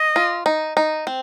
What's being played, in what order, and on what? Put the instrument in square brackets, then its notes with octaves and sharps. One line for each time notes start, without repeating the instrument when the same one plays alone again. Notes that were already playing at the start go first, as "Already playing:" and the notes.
Already playing: [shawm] D#5
[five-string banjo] F4
D#4
D#4
C4